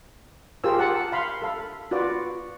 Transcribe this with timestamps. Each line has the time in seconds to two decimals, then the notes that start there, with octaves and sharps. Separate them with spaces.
0.64 F4 G4 G#4 A#4 C5 E6
0.78 A#4 F#5 A5 D6
1.12 F5 B5 C6
1.42 A4 F5 B5
1.91 F4 F#4 B4 D5